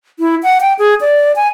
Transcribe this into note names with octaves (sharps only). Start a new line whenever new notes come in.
E4
F#5
G5
G#4
D5
G#5